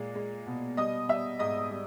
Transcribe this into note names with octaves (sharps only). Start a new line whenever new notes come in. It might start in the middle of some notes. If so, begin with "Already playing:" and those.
Already playing: A#2 G#3
G#3
B2
G3 D#5 D#6
G3 E5 E6
G#2 D#5 D#6
G3